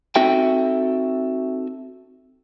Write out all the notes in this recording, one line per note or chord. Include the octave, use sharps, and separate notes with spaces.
C4 D#4 F#4 A4 E5 G5